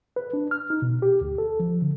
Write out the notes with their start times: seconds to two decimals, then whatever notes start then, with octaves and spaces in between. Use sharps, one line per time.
0.16 B4
0.33 D4
0.51 F6
0.70 D#4
0.82 B2
1.02 G4
1.21 D2
1.38 A4
1.60 F3
1.82 D3